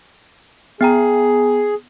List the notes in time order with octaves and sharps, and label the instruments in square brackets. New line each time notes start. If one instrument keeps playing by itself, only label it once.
[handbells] B3 G5 A#5 [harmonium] G#4